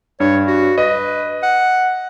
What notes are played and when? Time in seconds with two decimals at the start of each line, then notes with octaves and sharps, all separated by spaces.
0.20 G2 C#5
0.47 F#4
0.78 B4 D#5
1.43 F#5